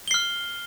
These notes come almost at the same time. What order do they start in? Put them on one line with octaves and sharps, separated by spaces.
G7 C7 F6